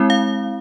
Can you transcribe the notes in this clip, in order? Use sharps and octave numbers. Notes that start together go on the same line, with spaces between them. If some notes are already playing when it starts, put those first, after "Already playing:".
Already playing: G#3 C4 E4
F5